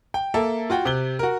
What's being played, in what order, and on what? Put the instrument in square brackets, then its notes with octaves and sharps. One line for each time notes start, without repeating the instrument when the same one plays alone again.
[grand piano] G5
A#3 A4 E5
F4 F#4 G5
C3 F#6 G7
F#4 A#4